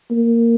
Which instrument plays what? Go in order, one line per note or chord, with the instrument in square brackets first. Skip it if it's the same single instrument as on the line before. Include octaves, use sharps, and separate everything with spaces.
[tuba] A#3